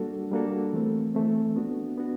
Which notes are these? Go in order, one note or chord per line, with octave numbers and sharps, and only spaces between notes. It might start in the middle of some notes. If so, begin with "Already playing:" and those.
Already playing: G3 A#3 D4 F#4 A4
G3 A#3 D4 F#4 A4
E3 A3 C4
E3 A3 C4
B3 D4 F#4
B3 D4 F#4